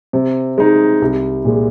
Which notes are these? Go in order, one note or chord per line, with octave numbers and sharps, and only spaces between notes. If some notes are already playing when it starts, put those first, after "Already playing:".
C3
G#3 D#4
C2
A#2 G#3